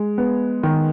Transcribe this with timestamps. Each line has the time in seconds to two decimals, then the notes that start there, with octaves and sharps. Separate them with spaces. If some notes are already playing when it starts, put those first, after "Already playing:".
Already playing: G#3
0.18 B3
0.63 D#3